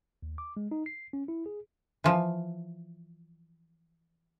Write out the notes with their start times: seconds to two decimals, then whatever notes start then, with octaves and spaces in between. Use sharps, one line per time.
0.23 D#2
0.38 D6
0.57 G#3
0.71 D#4
0.86 C7
1.13 C#4
1.28 E4
1.46 G#4
2.04 E3 F3